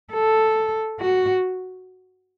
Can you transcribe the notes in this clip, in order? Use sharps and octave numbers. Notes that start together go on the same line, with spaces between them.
A4
F#4